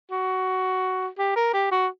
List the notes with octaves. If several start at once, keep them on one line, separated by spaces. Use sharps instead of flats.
F#4
G4
A#4
G4
F#4